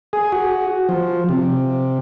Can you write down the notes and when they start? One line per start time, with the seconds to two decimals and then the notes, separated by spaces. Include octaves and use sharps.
0.13 G#4
0.32 F#4
0.89 F3
1.29 C3